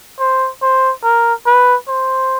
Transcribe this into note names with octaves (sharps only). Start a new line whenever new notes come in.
C5
C5
A#4
B4
C5